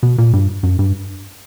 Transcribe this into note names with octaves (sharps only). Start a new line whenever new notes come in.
B2
A#2
G2
F#2
G2